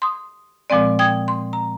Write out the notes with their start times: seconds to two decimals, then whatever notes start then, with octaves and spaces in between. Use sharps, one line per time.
0.02 C6 D#6
0.70 A#2 F3 G#3 C4 D5
0.99 G5 D#6 G#6
1.28 C6
1.53 A#5